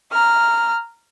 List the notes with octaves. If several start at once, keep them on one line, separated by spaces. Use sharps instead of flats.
A#5 F6